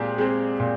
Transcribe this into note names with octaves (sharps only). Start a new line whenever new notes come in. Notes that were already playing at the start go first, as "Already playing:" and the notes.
Already playing: A#2 G#3 C4 G4 G#4
G#3 C4
A#2